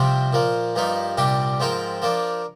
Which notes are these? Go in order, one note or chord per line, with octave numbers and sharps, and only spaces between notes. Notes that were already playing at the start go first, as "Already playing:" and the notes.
Already playing: C2 C3 F3 C4
A#2 F3 A#3
G2 F3 A#3 D#4
C2 A#2 G3 D4 G4
G#2 F3 C4 F4 A#4
F3 A#3 D4